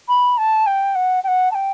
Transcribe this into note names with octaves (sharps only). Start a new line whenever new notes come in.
B5
A5
G5
F#5
G5
F#5
A5
G5